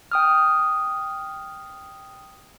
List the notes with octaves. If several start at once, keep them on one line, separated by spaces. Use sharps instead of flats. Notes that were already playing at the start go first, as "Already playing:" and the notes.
G5 D#6 F6